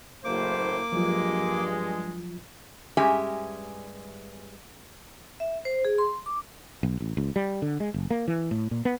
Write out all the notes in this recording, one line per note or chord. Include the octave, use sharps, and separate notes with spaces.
F#1 A2 A#3 C5 D6
G2 F3 F#3 G#3 F4
G2 G#3 C#4 G4 E5 G#5
E5
C5
G#4
C6
D6
B1
A1
C#2
G3
D3
G#3
F#1
A#3
E3
A2
A#2
B3